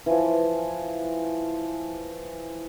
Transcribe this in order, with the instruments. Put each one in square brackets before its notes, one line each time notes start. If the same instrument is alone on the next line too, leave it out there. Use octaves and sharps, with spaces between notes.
[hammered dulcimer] E3 F3